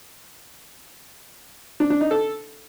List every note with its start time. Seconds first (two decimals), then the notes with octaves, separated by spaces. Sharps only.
1.80 D4
1.90 D4
2.01 D#4
2.11 A4